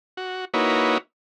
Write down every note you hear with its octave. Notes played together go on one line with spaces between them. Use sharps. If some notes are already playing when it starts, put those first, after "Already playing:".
F#4
A#3 D#4 E4 F#4 B4 C#5